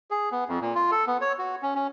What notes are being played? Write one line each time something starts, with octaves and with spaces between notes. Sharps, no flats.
G#4
B3
F2
A#2
F4
A4
B3
C#5
F#4
C#4
C#4